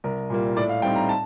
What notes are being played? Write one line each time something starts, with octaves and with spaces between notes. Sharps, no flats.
C2 A#4
A#2 G3 A#3
A2 D5
F5
G3 C4 D#4 G5
A#5
A5